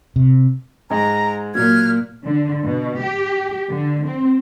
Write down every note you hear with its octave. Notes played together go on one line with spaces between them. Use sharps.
C3
G#2 G#3 A#5
A#2 F#3 F6 F#6 G#6
D3
B2
G4
D3
C4